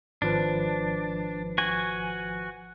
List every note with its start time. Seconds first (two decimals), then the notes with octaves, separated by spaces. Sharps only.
0.22 G#1 F3 D4 B4
1.58 F#4 G#5